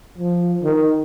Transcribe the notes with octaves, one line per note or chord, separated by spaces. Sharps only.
F3
D#3